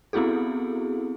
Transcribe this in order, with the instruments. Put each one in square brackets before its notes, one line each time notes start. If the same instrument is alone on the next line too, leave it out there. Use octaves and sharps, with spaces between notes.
[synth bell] B3 C4 E4 F#4 G#4 A4